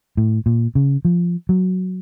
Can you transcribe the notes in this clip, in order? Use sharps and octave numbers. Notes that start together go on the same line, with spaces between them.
A2
A#2
C#3
F3
F#3